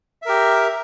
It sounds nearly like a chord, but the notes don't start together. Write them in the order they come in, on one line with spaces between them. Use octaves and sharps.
E5 A#4 G4